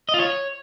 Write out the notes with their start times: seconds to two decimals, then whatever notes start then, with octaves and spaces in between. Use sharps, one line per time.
0.09 D#5
0.14 F4
0.19 C#5